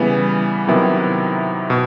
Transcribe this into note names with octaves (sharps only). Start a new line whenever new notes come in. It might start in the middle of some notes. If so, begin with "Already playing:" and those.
Already playing: C#3 E3 G3 B3 E4
C3 D#3 F#3 B3 E4
B2